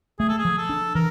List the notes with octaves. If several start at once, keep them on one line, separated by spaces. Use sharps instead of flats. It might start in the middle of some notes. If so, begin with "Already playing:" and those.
A3 G#4
A4
G#4
F3
A4
D4
E3 A#4